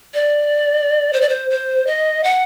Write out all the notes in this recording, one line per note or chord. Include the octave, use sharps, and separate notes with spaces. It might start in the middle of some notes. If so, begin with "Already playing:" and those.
D5
C5
D5
C5
C5
D#5
F#5